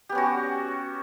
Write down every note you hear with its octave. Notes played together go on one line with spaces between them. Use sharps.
B3 C#4 F#4 G4